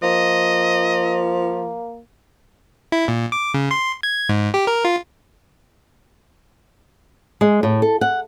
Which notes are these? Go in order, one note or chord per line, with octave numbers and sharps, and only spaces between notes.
F3 A#3 D#5
E4
A#2
D6
C#3
C6
G#6
G#2
G4
A#4
F4
G#3
A2
A4
F#5